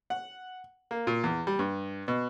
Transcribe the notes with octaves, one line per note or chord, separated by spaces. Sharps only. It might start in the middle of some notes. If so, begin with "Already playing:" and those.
F#5
A#3
A#2
E2
G3
G2
B2